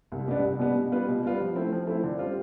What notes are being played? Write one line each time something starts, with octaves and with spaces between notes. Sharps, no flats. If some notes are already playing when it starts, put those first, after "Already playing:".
C2
B2 G3 B3 D4
C2
B2 G3 B3 D4
B2
G3 B3 F4 B4
B2
G3 B3 F4 B4
F3
A3 C4 E4
F3
A3 C4 E4
D3
G3 C4 F4